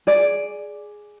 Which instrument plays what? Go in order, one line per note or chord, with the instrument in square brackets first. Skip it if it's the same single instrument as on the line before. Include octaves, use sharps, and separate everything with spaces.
[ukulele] G#4 D5